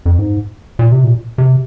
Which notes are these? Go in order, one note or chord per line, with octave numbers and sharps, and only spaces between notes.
F2
G#2
A#2
C3
A#2
C3